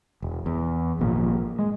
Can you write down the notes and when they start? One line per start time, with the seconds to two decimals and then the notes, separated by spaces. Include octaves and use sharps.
0.22 E1
0.46 E2
0.99 G#1 A#2 F3
1.59 G#3